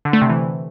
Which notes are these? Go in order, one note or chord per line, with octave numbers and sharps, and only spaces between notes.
D3
A3
C3
E3